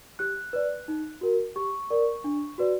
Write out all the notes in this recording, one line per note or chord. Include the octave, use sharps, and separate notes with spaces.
G4 F#6
B4 D5
D#4
F#4 A#4
G4 C#6
A#4 D5
D4
F#4 B4 D5